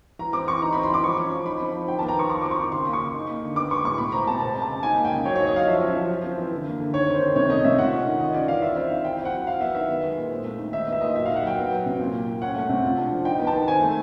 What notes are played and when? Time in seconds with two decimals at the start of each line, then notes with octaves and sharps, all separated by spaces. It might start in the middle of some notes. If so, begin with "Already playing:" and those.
0.19 E3 A#5
0.33 C4 D6
0.47 E3 C#6
0.62 D#4 A#5
0.73 C4 B5
0.83 C6
0.90 E3 D6
1.03 F3 C#6
1.17 C#4
1.31 F3
1.46 D#4 B5
1.60 C4
1.74 F3
1.88 D#3 G5
1.99 B3 A5
2.08 A#5
2.16 D#3 C#6
2.30 F4 C#6
2.41 C4 D6
2.51 C#6
2.58 D#3
2.72 C#3 C6
2.86 A#3
2.93 C#6
3.01 C#3
3.14 D#4
3.28 A#3
3.42 D3
3.56 B3 D6
3.70 G#3 C#6
3.84 A2 C#6
3.98 B2 B5
4.12 C4 A#5
4.27 B2 A5
4.40 C4 A5
4.54 G#3
4.62 A5
4.69 C#3
4.83 D#4 G#5
4.96 A#3
5.05 G5
5.11 C#3
5.25 F#3 C#5
5.35 D#4 C#5
5.47 D#5
5.54 F#3 F5
5.67 F3 E5
5.81 C#4
5.95 F3
6.09 F4
6.24 C4
6.38 E3
6.52 D3
6.66 A#3
6.80 D3
6.93 D#3 C#5
7.08 C4
7.15 C5
7.21 D#3
7.36 C3 C#5
7.50 A3 D#5
7.64 C3 E5
7.79 F4 F#5
7.93 C#4
8.07 D#3
8.19 F4 D#5
8.34 C#4 D5
8.48 E3 F5
8.62 F4 E5
8.76 C4 E5
8.90 D#3 F5
9.04 E4 G5
9.18 C4
9.25 F#5
9.32 F#3
9.46 E4 F5
9.60 B3 E5
9.75 D#3 E5
9.88 B3
10.03 G#3
10.17 A#2
10.31 C4
10.45 A3
10.58 D#3
10.73 D#4 E5
10.87 B3
10.92 E5
11.01 A#2 D#5
11.15 F#3 E5
11.26 D#4 F5
11.36 F#5
11.43 F#3 G5
11.57 B3
11.71 F#3
11.86 C3
12.00 A#2
12.13 A#3
12.27 A#2
12.41 C#4 F#5
12.56 A3
12.69 C3
12.84 F4
12.97 D4
13.11 F3
13.25 D#4 G5
13.39 B3
13.47 A5
13.54 D#3
13.68 C4 G#5
13.81 A3